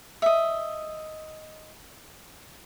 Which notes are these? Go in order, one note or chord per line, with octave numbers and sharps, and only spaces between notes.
D#5 E5